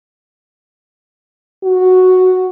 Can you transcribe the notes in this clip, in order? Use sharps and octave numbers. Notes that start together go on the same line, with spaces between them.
F#4